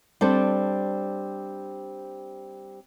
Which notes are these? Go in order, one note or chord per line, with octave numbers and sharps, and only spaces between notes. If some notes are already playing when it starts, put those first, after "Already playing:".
G3 C4 D4 A4 C5